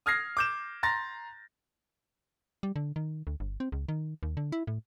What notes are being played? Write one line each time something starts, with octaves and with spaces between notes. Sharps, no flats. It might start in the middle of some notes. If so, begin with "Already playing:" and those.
D#6 F6 G#6 A#6 C7
D6 G6 E7
A#5 C6 A6 A#6
G3
D3
D#3
D2
G1
C4
C#2
D#3
D#2
D3
E4
A2